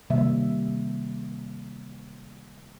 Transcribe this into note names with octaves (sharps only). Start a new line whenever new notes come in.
C3 D#3 G3 A#3 E5